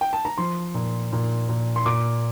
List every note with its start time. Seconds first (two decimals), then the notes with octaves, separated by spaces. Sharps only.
0.01 G5
0.13 A5
0.25 A#5
0.38 F3 C6
0.74 A#2
1.13 A#2
1.49 A#2
1.76 C6
1.86 A#2 D6